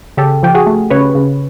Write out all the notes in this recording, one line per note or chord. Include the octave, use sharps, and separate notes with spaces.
C#3 G4 A4
F3 G4
F#4 G#4
A3
C#3 B4 C#5
C#3